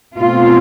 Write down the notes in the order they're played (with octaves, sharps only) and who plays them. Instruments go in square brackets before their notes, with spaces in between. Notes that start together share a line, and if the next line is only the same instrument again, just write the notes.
[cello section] B2 A3 C4 F4